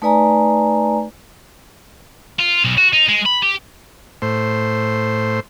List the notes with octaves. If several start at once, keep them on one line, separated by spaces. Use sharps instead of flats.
A3 D#4 B4 D5 G#5 A#5
F4
B1
F#4
D#4
G#3
B5
G4
A2 C5